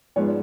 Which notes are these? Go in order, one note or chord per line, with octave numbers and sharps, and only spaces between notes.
G#2 F3 G#3 B3 C#5